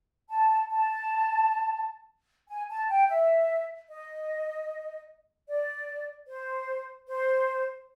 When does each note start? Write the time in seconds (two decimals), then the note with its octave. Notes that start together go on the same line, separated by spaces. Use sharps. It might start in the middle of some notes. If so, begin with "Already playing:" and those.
0.30 A5
0.70 A5
2.48 G#5
2.69 A5
2.89 G5
3.09 E5
3.89 D#5
5.48 D5
6.27 C5
7.08 C5